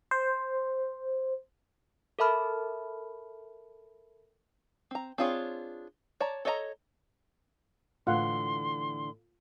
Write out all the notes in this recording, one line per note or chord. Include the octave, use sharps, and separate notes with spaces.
C5
A4 A#4 E5 A5 B5 F6
C4 A#5
C4 D4 F4 G#4 C#5
C#5 D5 A5 A#5
A4 C#5 D#5 E5 A#5
A2 D3 E3 F4 F5 F#5 C6